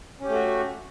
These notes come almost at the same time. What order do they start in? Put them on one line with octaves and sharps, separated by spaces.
C#4 G4 A3 F#4